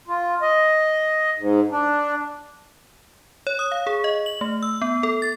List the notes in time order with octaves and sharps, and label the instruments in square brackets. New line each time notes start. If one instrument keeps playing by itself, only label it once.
[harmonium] F4
D#5
G#2
D4
[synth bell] C#5
D#6
F5
G#4
D#5
F#7
A3
E6
B3
A4
A6